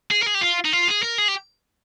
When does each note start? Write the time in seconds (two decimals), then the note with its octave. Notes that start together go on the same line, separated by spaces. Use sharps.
0.11 G#4
0.22 A#4
0.26 G#4
0.35 G4
0.41 F4
0.65 D#4
0.73 F4
0.88 G#4
1.03 A#4
1.18 G#4
1.28 G4